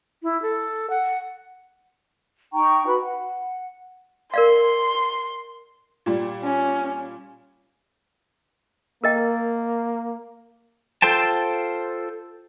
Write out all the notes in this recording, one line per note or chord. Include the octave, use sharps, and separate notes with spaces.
E4
A4
F#5
D#4 G5 A#5 C#6
F#4 B4 B5
F#5
A#4 D5 F5 C6
A#2 G3
C#4
A#3 A#4 D#5 G5
F4 A4 C5 G5 A5